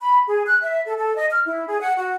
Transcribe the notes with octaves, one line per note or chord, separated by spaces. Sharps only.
B5
G#4
F#6
E5
A4
A4
D#5
F6
E4
G#4
F#5
F#4